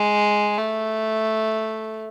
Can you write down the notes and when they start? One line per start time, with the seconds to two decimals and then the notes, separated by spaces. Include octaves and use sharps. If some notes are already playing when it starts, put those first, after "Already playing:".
Already playing: G#3
0.58 A3